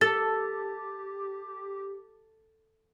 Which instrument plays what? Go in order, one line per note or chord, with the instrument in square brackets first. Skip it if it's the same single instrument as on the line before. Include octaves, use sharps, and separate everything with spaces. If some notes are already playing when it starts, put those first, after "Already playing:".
[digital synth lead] G4 [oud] A4 [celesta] A6